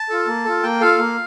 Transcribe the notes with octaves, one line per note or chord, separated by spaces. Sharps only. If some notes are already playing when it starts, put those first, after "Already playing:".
Already playing: A5
F4 A4
A#3
F4 A4
A#3 G5
F4 A4 F5
A#3